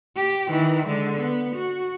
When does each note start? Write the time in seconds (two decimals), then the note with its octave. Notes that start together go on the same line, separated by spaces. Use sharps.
0.16 G4
0.49 D#3 E3
0.87 D3 G#3
1.18 B3
1.55 F#4